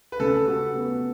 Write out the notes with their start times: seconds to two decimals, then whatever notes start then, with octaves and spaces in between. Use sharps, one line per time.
0.12 B4
0.20 C#3 A4
0.47 F#4
0.75 B3